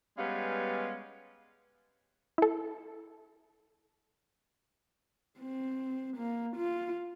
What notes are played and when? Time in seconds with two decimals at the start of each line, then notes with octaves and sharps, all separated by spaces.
0.18 G3 G#3 B3 C#4 B4 F5
2.38 E4 A4
5.40 C4
6.17 A#3
6.57 F4